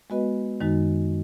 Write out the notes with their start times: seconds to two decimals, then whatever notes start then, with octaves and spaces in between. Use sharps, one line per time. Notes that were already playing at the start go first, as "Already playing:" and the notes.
0.10 G#3 B3 F#4 B4 D#5
0.61 F#2 D#3 G#3 D#4 F#4